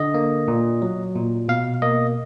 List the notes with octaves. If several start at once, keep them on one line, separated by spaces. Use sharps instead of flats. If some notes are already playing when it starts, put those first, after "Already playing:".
Already playing: D3 D#5
A#3
A#2
F#3
A#2
B2 F5
A#3 D#5